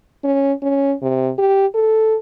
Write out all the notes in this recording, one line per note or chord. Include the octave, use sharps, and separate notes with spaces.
C#4
C#4
C3
G4
A4